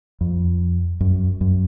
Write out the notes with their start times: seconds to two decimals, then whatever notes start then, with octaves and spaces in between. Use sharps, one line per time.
0.21 F2
1.00 F#2
1.41 F#2